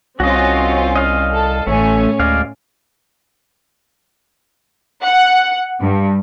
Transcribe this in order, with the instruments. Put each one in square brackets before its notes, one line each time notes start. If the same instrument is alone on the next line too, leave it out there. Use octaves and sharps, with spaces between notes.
[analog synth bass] C2 [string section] C4 C#4 F4 [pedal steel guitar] F#4 D#5
[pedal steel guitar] D#5 F5
[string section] A4
[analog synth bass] A1 [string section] A2 C#4 G#5 [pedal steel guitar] A3
[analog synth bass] D2 [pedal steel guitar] G#3 D5 F5
[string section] F#5
G2